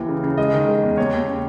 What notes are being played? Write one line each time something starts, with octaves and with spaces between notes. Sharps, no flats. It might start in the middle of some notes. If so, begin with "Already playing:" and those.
Already playing: D#2 E3
C#3
C#3
G#3 D#5
D#3
G#3
E2
D#2 C#5
D#2
C#3